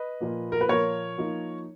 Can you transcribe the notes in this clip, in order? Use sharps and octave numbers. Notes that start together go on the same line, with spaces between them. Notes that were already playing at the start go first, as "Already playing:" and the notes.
Already playing: B4 D#5
A#2 F3 A#3
A#4
B4
A#2 F3 A#3 A#4 C#5
F3 A#3 D#4